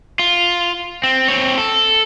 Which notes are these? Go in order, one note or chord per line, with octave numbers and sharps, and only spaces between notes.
F4
C4
C4 C#5
A4